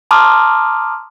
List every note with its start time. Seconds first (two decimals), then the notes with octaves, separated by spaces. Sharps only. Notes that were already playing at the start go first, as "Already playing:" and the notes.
0.11 A5 A#5 C6 D6 D#6 F6